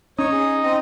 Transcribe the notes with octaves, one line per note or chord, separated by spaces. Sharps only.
C#4 D#4 C#5
G#4
C4 D#5